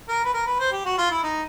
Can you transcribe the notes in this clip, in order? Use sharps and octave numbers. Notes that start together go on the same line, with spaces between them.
A#4
B4
A#4
B4
C5
G4
F#4
F4
E4
D#4